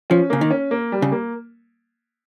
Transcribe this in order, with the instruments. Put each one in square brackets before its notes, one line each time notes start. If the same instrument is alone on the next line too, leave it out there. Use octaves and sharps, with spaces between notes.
[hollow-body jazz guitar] F3 [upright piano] C#4
[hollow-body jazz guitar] C#3 [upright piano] A#3
[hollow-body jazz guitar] D#3
[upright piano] C#4
A#3
G3
[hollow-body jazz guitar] C#3
[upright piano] A#3